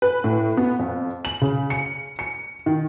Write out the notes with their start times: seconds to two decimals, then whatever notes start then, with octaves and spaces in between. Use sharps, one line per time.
0.02 B4
0.24 A2
0.57 B3
0.79 F2
1.25 F#7
1.41 C#3
1.70 C#7
2.19 C#7
2.66 D#3